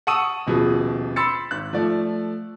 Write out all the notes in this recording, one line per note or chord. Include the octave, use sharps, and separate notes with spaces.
F#5 A5 C#6 D#6 E6 D#7
D#1 B2 F3 G#4
B5 C6 E6 A6 C#7
G#1 F#6
F3 A3 D5